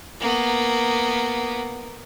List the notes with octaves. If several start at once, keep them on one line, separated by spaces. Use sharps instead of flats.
A#3 B3